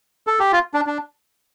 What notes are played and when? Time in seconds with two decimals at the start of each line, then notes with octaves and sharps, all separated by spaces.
0.27 A4
0.39 G4
0.52 F4
0.74 D4
0.87 D4